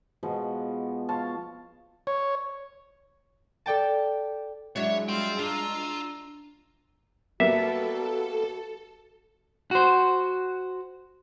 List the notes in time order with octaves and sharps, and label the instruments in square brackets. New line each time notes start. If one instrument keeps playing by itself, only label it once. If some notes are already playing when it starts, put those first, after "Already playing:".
[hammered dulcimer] B2 F3 G#3 B3
F4 C#5 F5 A5
[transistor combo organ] C#5
[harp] A4 D5 G5 A5
[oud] F#3 D4 E4 [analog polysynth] G#3 [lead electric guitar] C#5
[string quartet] G3 F4 F5 [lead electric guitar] G5 C6
[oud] D4 [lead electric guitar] F4 [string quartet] A#5 E6
[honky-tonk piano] G3 A#3 B3 [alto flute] F#4 [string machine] A4 [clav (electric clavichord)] E5
[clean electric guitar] F#4 C5